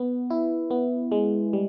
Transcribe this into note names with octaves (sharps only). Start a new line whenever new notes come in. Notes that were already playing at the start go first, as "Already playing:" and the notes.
Already playing: B3
E4
B3
G#3
G3